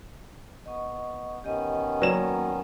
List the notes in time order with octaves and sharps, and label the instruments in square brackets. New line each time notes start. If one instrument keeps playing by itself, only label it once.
[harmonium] B3 [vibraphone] D#5 C#6
[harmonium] D#3 B3 C#4 [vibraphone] G4 D#5
[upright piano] F#3 E7 [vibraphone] A#3 [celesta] B4 D5